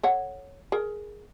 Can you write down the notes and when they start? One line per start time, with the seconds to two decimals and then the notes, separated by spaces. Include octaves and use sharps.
0.03 A4 C#5 F#5
0.72 G#4 A#4